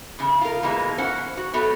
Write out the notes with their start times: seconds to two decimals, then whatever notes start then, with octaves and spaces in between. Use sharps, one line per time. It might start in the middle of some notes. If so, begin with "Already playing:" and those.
0.19 E2 C#3
0.41 F4 A#4
0.62 B2 E3 F3 G#3 A#3
0.98 C#4 C5 F#5
1.37 F#4
1.53 F#3 A3 B3 F#4